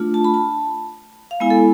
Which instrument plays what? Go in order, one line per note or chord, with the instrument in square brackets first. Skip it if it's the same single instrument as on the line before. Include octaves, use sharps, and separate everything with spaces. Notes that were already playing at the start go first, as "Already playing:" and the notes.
Already playing: [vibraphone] A3 D4 F4
A5
B5
A5
F5
G#3 B3 E4 G#5
A4